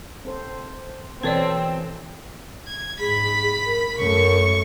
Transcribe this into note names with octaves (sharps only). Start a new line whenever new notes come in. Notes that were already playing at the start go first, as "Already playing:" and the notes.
C4 A4 C5
B2 E3 C4 A4 B4 C#5 D5
G#6
G#2 G#4 B5 B6
A#4
F#2 A3 C#6